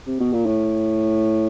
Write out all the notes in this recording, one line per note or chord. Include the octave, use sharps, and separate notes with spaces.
C3
B2
A#2
A2